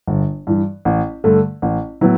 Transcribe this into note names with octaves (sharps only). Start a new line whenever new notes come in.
G1
G2 E3
A1
G2 D3 A3
A1
A2 F#3 B3 E4